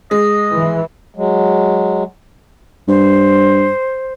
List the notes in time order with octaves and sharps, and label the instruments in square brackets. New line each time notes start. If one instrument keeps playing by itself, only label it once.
[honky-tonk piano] G#3 [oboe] D#5
[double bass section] E3
[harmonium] F#3 G#3
[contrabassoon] G2 [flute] C5